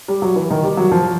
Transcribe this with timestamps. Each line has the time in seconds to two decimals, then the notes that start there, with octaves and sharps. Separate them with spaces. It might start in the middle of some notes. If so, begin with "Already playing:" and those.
0.08 G3
0.22 F#3
0.36 E3
0.50 D#3
0.64 G3
0.77 F#3
0.92 F3